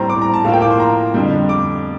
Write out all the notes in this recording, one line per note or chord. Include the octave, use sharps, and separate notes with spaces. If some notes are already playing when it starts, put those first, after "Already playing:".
Already playing: A2 G3 C4 A#5 C6
D6
A#5
A5
A2 F3 A#3 F5
G5
D6
C6
A#5
F2 D3 G3
D6